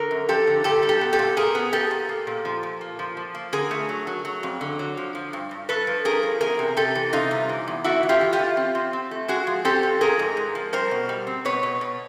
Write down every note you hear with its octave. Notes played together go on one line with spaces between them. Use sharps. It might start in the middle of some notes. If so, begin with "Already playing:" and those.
Already playing: D3 A#4
F#2
F3 G4 A4
D3
A#2 G4 A4
G3
G4 A4
B3
G4 A4
A#2
A#2 G#4 A#4
B3
B3 G4 A4
A#2
A#3
A#2
F3
A#2
A#3
F3
F3
A#3
D3 G#4 A#4
A3
F#3
F#3
F#3
F2
D3
F#3
F3
F3
G2
G2
G2 A4 B4
F3
G2 G#4 A#4
F3
E2 G#4 A#4
C3
C3 G4 A4
E3
C3 D#4 F4
G3
E3
E2
A3 E4 F#4
E3
F4 G4
E3
F4 G4
E3
C4
C4
C4
A3
G#3 F#4 G#4
F3
C4 G4 A4
F3
F3 G#4 A#4
G#2
G#2
F3
G3 A#4 C5
B2
G3
C4
B2 B4 C#5
B2
B2